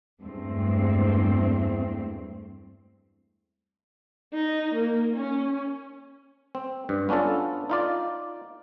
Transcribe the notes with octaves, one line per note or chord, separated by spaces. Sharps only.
E2 G2 G#3 A3 C4
D#4
A#3
C#4
C4
G2
B3 C#4 D4 F4 A4
D#4 F4 D5